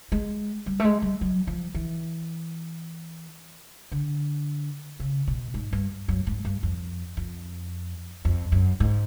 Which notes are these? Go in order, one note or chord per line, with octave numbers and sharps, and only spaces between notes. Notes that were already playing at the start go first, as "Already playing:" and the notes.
G#3
G3
A3
G#3
G3
F#3
F3
E3
D3
C#3
B2
G#2
G2
F#2
G#2
G2
F2
F2
F2
F#2
G#2